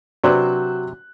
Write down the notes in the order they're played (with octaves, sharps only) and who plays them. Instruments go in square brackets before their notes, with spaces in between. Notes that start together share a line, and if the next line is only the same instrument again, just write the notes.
[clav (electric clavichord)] C3 F#3 [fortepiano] D4 B4 C5 [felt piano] F#4 F#6